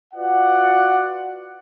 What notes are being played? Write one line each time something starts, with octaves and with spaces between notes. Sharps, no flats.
F4 F#4 B4 D5 F#5